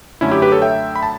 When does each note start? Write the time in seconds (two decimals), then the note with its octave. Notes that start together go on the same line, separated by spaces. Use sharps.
0.21 F#2 D3 A3 C#4 E4
0.31 E4 G4
0.42 G4 B4
0.52 A4 C#5
0.62 E5 G5
0.96 B5
1.03 A5